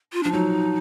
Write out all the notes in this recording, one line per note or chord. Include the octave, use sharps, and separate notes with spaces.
F4
F3 D4
F#3 D#4